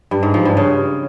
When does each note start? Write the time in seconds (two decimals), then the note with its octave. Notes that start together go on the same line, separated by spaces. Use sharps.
0.11 G2
0.23 G#2
0.34 F3
0.45 G2
0.57 C#3